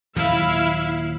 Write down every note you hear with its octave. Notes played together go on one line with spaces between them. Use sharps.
D#2 A#2 F#3 E4 F5